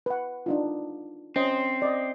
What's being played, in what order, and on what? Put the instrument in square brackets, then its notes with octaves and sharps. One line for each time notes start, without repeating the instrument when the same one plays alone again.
[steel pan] B4 F#5
D4 D#4 F4
[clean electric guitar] C4 [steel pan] C#4 C5 D#5
[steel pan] D5 D#5